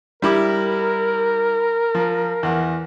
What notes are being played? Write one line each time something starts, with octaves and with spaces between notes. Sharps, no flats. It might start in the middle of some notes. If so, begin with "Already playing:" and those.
G3 E4 G4 A#4
F3
E2 F#5